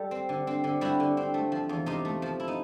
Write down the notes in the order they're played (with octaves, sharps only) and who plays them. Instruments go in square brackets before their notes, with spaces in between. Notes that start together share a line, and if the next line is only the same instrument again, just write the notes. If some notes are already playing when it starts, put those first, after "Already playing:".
Already playing: [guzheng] G3 A4
C4
D3
C4
D3
G3 E4 F#4
D3
C4
A3
F3
E2
C3 D#4 F4
A3
F3
E4
D#4